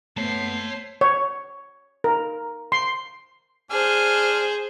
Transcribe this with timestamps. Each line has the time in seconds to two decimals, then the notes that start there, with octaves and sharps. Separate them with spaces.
0.17 A3 B3 C5 C#5 A5 C7
1.01 C#5
2.04 A#4
2.72 C6
3.71 D4 G#4 C5 F6